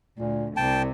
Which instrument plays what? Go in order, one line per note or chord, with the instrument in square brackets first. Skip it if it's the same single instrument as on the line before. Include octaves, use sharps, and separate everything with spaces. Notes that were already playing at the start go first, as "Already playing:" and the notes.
[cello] D2 [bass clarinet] A#2
[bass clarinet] C2 [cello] C3 [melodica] G5 A5